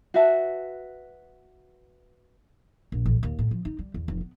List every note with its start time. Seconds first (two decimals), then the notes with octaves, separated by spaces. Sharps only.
0.14 F#4 B4 E5 A5
2.92 A#1
3.06 A1
3.23 D#2
3.39 A2
3.51 F3
3.65 D#4
3.79 G3
3.94 E2
4.08 F1
4.21 B3